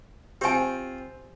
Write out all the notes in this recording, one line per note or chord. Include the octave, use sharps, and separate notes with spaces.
C4 F4 G4 G#5